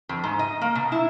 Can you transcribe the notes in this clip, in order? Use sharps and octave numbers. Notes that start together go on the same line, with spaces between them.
F2
G#2
D#5
A#3
B2
E4